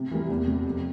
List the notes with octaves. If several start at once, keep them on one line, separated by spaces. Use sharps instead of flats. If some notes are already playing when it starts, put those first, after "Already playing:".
Already playing: C3
E3 G3 A#3
E2
C3 G3
F2